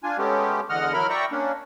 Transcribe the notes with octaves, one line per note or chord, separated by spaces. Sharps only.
D4 F4 G#5
G#3 A3 B3 C#4 G4
E2 D3 D#5 F#5 F6
F#3 E4 A#4 B5 F6
D5 E5 G5 A#5 C#6
A#3 C#4 D4